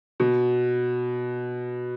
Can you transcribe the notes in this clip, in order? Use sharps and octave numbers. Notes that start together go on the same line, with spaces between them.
B2